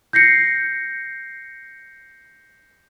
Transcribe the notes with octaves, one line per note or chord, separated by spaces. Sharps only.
G6 A#6 C7 C#7